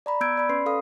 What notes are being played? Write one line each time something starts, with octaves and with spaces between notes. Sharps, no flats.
D5 A#5 B5
B3 E6 G6 G#6 D7
D5 B5
C#4 B4 C6 C7
A4 F5 D#6